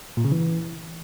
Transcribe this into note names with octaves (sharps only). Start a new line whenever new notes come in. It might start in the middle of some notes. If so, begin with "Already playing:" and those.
A#2
C#3
E3